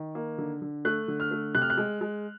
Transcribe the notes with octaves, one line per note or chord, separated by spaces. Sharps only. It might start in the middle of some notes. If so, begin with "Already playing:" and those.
Already playing: D#3
A#3
D3
D3
A3 F#6
D3
F6
A3
C3 F#6
F6
F#6
G#3
G#3